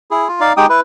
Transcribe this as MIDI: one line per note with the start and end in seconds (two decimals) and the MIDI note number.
0.11 0.28 64
0.11 0.28 68
0.28 0.40 65
0.40 0.53 63
0.40 0.53 74
0.40 0.53 77
0.57 0.66 56
0.57 0.66 63
0.57 0.66 67
0.57 0.66 79
0.57 0.66 87
0.69 0.80 64
0.69 0.80 71